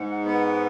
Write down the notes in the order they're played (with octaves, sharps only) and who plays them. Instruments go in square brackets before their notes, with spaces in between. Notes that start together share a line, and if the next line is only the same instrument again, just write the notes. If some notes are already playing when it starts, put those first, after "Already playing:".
Already playing: [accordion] G#2 [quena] F#5
[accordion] B3